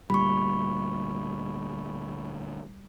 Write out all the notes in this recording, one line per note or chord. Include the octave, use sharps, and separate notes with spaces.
D2 A#2 G3 B5 C#6